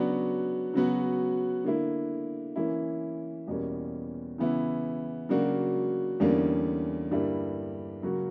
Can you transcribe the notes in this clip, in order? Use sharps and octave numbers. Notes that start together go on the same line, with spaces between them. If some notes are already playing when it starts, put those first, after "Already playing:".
Already playing: C#3 F#3 B3 D4 F#4
C#3 F#3 B3 F#4
D3 A#3 E4
E3 A#3 C#4 E4
E2 B2 G3 A#3 C#4
C#3 E3 B3 E4
C#3 F#3 A#3 D4 F#4
E2 D3 G3 A#3 C#4
G2 D3 G3 A#3 E4
C#3 F#3 A#3 C#4 F#4